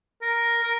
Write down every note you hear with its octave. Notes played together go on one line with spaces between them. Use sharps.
A#4
A#4